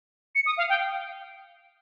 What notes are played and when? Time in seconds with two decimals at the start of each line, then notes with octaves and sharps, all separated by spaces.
0.35 C#7
0.46 D#6
0.58 F5
0.69 G5